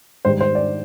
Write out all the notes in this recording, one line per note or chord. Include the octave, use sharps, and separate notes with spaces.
G#2 D#3 G3 C5
C5
D5